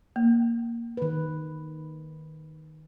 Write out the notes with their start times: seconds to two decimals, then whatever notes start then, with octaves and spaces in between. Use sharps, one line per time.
0.16 A#3
0.97 D#3 B4